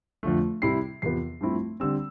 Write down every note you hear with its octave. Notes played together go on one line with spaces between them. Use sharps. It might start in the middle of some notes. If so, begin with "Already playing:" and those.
F2 D3 F3 A3
C3 G3 C4 E4 C7
E2 C3 F3 B3 C7
G2 F3 A3 C4 E4
D3 G3 C4 E6